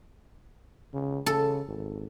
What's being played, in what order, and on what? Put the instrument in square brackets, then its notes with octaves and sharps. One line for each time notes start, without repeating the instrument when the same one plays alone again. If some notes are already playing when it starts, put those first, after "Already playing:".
[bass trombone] C#3
[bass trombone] C#3 [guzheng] A4
[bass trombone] G#1